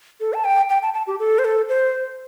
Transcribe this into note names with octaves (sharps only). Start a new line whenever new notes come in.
A4
A5
G5
G5
A5
A5
G4
A4
C5
A4
C5